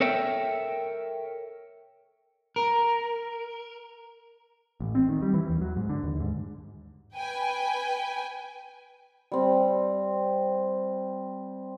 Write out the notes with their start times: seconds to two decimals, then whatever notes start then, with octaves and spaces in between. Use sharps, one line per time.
0.01 A4 A#4 C#5 E5 G5
2.56 A#4
4.80 A1
4.95 C4
5.09 D#3
5.22 G3
5.34 E3
5.49 D#2
5.61 F#3
5.77 G#2
5.90 D3
6.03 D#2
6.20 G#2
7.16 B4 G5 G#5
9.32 G3 C4